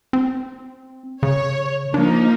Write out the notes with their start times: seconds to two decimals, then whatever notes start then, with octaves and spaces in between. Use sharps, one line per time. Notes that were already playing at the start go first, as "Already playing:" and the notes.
0.13 C4
1.23 C#3 C#5
1.94 F3 A#3 D4 D#4